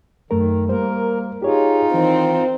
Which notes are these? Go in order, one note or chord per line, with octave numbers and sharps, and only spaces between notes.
F#2 D#3 A3 A#4
G3 A#3 A#4 C5
D#4 F4 G4 G#4 C#5
D#3 E3 C4